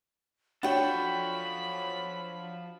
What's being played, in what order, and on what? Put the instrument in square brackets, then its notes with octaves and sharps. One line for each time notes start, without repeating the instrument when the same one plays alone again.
[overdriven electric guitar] F3 A4 [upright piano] D4 F#4 C#5 [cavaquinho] F#5 G5 [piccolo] B5